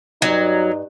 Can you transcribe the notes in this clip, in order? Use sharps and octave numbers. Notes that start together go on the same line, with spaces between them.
E2 G2 F#3 D#4